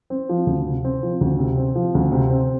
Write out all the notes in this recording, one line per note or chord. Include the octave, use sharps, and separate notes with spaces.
C4
F3
D2
C3
C4
F3
D2
C3
C4
F3
D2
C3
C4